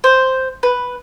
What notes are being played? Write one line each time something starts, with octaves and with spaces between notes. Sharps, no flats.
C5
B4